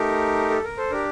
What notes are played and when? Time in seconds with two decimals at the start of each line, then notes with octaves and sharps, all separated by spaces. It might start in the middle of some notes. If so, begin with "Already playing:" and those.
Already playing: A3 D#4 G4 A#4
0.50 A4
0.64 A#4
0.77 A4 C5
0.90 D4 G4 A#4